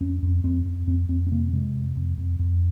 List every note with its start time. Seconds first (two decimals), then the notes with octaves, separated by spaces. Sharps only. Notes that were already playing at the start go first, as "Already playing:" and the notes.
0.01 F2 C#4
0.23 F2
0.44 F2 C4
0.66 F2
0.87 F2 C4
1.09 F2 C4
1.27 C4
1.32 C3 A#3
1.53 C3 G#3
1.75 F2
1.96 F2
2.18 F2
2.39 F2